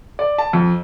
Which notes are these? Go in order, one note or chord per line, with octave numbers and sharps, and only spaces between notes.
D5
A5
F2